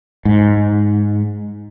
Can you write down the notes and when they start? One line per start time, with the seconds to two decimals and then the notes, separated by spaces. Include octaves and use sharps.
0.25 G#2